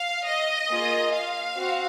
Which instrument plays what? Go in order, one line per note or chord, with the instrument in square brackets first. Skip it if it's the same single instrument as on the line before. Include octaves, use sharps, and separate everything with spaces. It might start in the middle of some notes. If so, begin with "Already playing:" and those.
Already playing: [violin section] F5
D#5
A#3 F4 G#4
F5
C4 F#4